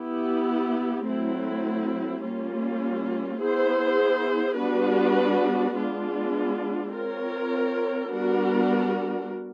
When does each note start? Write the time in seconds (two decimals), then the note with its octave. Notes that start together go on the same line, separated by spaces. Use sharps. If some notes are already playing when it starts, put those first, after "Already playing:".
Already playing: B3 E4 G4
1.06 F#3 A3 C4 E4
2.23 G3 A#3 C#4 F4
3.40 B3 E4 G#4 C5
4.58 G3 B3 D4 F#4 B4
5.76 G#3 B3 D4 F4
6.93 C4 F4 A#4 C#5
8.10 G3 B3 D4 F#4 A#4